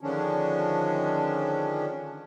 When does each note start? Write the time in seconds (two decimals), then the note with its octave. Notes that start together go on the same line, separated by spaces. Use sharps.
0.01 D3 D#3 F3 G#3 C#4 D4